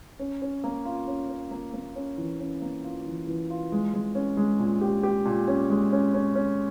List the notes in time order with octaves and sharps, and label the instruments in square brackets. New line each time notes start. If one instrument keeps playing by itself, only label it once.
[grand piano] C#4
C#4
A#3
F4
C#4
C#4
A#3
A#3
C#4
E3
C#4
A#3
F4
E3
E3
F4
G#3
G#3
C#4
G#3
A#2
G4
G4
A#2
C#4
G#3
C#4
C#4
C#4